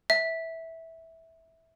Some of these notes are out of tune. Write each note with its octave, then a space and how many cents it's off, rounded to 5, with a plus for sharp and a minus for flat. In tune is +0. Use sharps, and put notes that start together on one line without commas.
E5 -10